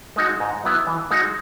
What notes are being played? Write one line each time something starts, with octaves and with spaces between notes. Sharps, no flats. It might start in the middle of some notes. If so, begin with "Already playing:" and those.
G#3 D#4 F#4
G#2
F#3 B3 E4
E3
G#3 D#4 F#4